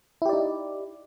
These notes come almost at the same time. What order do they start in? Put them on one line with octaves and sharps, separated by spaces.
E4 G4 D5 D#4